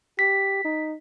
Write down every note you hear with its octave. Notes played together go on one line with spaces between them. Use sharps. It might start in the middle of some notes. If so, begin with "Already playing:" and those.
G4 B6
D#4